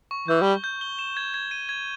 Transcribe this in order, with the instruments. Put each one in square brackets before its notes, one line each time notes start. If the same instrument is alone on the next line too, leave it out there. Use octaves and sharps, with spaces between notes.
[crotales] C#6
[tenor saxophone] E3 [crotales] G6
[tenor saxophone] G3 [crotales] G7
[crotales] G6
G7
E7
G#6
G#6
D#7
G#6